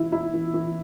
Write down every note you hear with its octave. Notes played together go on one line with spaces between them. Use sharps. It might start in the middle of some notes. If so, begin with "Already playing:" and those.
Already playing: E3 E4
E4
E3
E3